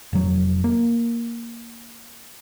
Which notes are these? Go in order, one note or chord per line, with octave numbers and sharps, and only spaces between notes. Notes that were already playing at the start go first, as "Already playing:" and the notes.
F1 F#3
A#3